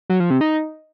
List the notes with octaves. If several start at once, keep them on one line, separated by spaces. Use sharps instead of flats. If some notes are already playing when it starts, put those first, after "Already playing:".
F#3
F3
C3
D#4